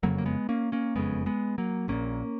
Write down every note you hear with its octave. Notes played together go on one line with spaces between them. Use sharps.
F#1 F2 C#3 F#3 A#3
A#3
G#3 B3
A#3 C#4
A#3 C#4
F#1 F2 C#3 G#3 B3
G#3 B3
F#3 A#3
A#1 A#2 A#3 C#4